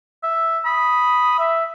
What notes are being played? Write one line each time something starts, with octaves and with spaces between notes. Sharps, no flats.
E5
B5 D#6
E5